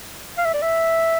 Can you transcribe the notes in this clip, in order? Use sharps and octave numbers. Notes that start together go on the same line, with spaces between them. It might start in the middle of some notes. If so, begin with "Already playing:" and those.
F5
E5
D5
E5